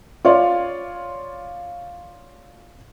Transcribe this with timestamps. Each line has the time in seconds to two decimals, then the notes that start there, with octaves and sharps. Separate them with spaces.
0.25 F4 C#5 D5